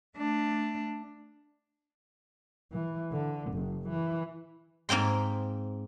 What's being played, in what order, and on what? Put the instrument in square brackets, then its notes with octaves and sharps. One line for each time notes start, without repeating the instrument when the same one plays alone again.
[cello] A3 D4
[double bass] E3
D3
F#1
E3
[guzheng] G#2 A#3 C4 G5 C6